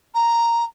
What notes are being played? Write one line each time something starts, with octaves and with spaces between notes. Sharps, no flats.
A#5